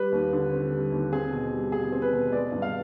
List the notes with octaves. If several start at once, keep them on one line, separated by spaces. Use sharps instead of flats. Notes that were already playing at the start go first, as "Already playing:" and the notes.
Already playing: G3 B4
D#2
D3
C4
G3
D#2
C4 G#4
B2
G3
B2 G#4
C4
B4
B2
G#3 D5
G2
F5